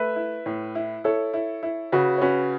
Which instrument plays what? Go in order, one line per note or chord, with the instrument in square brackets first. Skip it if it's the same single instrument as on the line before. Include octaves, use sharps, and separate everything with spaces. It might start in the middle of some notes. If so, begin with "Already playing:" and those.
Already playing: [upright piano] A3 [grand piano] B4 E5
[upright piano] E4
A2
E4
[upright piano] E4 [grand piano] A4 C#5
[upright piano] E4
E4
[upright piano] C#3 [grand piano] F#4 B4
[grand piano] C#5
[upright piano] C#4 [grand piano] F#4 B4